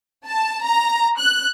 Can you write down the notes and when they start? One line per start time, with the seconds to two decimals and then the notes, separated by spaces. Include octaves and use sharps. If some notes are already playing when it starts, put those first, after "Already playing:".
0.27 A5
0.65 A#5
1.19 F#6